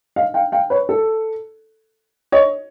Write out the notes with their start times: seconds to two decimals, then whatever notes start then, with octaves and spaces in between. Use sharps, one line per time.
0.16 D#5 F5
0.34 F5 G5
0.52 F5 G5
0.70 B4 C#5
0.89 A4
2.32 C#5 D#5